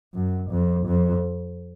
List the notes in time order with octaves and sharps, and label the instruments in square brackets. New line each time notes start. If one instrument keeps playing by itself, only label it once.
[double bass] F#2
F2
F2